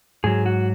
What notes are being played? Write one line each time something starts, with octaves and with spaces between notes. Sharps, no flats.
G#2 F#3 G#4
F#4